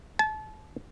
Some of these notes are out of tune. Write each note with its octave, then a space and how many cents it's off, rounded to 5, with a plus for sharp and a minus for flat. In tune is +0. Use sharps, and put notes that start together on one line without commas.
A5 -30